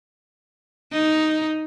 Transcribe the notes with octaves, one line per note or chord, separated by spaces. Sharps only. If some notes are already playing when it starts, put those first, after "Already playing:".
D#4